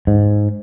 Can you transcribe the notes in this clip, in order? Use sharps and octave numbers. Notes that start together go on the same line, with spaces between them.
G#2